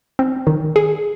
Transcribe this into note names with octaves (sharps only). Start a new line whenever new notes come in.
C4
D#3
G#4